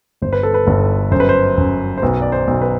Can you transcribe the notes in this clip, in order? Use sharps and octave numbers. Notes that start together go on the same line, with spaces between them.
G1 C5
B4
A4
B4
G1
F#2 C5
B4
C5
F#2
C5
B1 B4
D5
C5
B1
B4